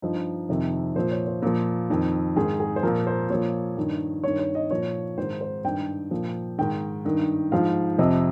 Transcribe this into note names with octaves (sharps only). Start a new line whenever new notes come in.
G2 F3 D#4
F2 C3 D#3
A#2 F3 C5
C#5
C5
A#2 F3
F2 D#3
G#2 D#3 G#4
G#4
C5
A#2 F3 A#4
C5
A#2 F3 C#5
G2 D#3
G2 D#3 C#5
C#5
D#5
A#2 F3 C#5
G#2 D#3 C5
C5
G2 D#3 G5
A#2 F3
G#2 D#3 G5
G2 D#3
G#2 F3 F5
F2 C3 F3 D#5